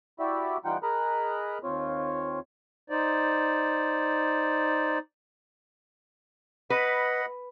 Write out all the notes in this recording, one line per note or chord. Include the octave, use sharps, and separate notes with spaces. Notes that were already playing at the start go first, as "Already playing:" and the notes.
E4 F#4 G4 D5 E5
E3 G3 D#4 F4 F#5 G5
G#4 A#4 D#5 A#5 B5 F#6
D#2 C4 F4 C#5
D#4 C5 D5
B4 D#5 F#5 B5